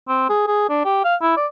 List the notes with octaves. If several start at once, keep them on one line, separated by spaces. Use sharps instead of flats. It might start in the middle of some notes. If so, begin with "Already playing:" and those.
C4
G#4
G#4
D4
G4
F5
E4
D5